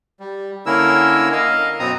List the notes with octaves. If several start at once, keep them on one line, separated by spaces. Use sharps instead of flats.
G3
D3 A#3 C#4 E4 A#4 E6
A#4 D#5 F5
F#2 B2 B3 C4 A#5 D#6